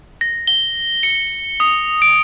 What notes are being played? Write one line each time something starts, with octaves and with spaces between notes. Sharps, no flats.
A#6
G7
C#7
D#6
D7